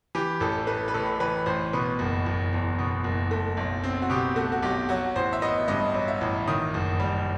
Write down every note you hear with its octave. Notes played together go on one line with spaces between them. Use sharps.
E3 G4
A1 A4
A3 B4
B4
A2 A4
E3 B4
A1 C5
B2 B4
F#1
F#1
E2
B2
F#1
A3
B1
C4
F#4
B2 G4
A3 F#4
F#4
B1 G4
F#3 F#4
A1 C5
E5
B3 D#5
G2 D#5
F#3
E5
A1
D#3 D#6
F#1
G3